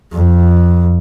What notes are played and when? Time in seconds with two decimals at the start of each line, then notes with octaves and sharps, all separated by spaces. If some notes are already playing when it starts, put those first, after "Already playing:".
0.13 F2